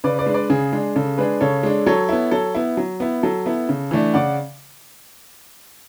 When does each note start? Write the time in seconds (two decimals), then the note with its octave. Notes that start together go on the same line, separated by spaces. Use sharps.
0.04 C#3 B4 D5
0.19 B4 D5
0.26 G#3 D4
0.34 B4 D5
0.50 C#3 G#4
0.73 G#3 D4
0.96 C#3 A4
1.18 G#3 D4 G#4 B4
1.41 C#3 A4 C#5
1.63 G#3 D4
1.86 F#3 A4 C#5
2.09 B3 E4
2.31 F#3 A4 C#5
2.55 B3 E4
2.77 F#3
3.00 B3 E4
3.23 F#3 A4
3.46 B3 E4
3.69 C#3
3.91 E3 A3 D4
4.14 C#3 D5 F#5